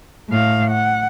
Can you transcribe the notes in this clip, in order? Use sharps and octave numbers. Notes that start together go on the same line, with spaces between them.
A2 F5
F#5